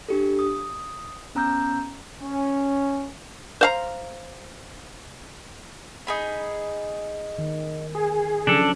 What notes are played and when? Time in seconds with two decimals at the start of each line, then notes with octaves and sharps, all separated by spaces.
0.09 D4 G4 A4
0.39 D#6
1.35 B3 C#4 A#5 E6 G6
2.22 C#4
3.61 C5 F5 A#5
6.07 D#4 G#4 B5
7.39 D#3
7.95 G#4
8.47 C#3 F3 F#3 D4 A4